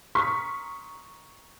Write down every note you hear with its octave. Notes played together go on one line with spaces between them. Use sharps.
A#5 C6 C#6 D#6 F6 B6